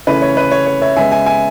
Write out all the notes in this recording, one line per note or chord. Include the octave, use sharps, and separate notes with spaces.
C#3 E3 A3 C#4 B4
C#5
B4
C#5
C#5
C#5 E5
C#3 G#3 B3 E5 G#5
E5 G#5
E5 G#5